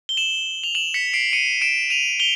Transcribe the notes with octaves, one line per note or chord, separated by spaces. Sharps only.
G7
E7 F#7
F7
E7 F#7
B6 C#7
C7 D7
C#7 D#7
D7 E7
D#7 F7
F7 G7